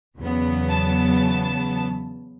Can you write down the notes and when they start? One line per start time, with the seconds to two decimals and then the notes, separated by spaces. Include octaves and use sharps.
0.18 E2 C#3 F#3 B3
0.69 A5